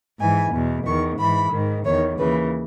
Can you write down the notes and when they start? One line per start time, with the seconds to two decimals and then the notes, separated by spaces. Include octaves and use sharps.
0.20 G#2 E3 G#5
0.53 E2 B2
0.86 E2 D#3 C#6
1.19 G#2 E3 B5
1.52 G#2 D#3
1.85 E2 D#3 C#5
2.18 D#2 C#3 E3 B4